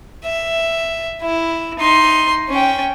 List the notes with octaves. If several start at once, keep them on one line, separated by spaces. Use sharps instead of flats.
E5
E4
D#4 C6
C#4 G5